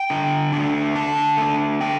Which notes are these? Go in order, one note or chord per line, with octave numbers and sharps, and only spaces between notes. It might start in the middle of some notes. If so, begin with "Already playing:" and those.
Already playing: G5
D3
A3 D4
D3 A5
A3 D4
D3 G5